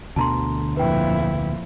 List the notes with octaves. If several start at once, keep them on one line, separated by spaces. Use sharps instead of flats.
D2 B2 D3 A5 A#5 C6
F2 A#2 E4 B4 G5